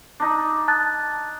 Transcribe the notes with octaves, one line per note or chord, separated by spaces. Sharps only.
D4 D#4
A5 F#6 A6